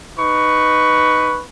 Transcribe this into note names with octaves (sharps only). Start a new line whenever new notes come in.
D#4 B4 C#6